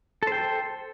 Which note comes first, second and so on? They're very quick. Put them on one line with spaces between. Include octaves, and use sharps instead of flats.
A4 C5 G5